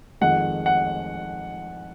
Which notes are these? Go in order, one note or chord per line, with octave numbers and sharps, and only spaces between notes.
F2 D#3 G#3 F#5
F#5